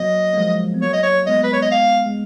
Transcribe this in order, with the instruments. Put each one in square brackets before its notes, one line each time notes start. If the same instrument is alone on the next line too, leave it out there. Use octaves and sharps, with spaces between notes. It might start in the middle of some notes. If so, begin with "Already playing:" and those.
Already playing: [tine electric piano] F#3 A#3 [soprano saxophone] D#5
[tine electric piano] A#3
F3 G#3
B3
[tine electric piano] F#3 A#3 [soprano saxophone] C#5
[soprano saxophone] D#5
C#5
[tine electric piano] A#3
[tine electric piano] G#3 B3 [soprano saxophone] D#5
[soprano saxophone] B4
C#5
D#5
F5
[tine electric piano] G#3